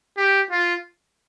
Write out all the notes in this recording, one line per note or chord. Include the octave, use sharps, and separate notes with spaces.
G4
F4